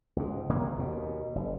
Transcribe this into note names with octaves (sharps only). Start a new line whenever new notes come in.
C#2 G#2
G1 C3 A#3 B3
D#2 B2
F#1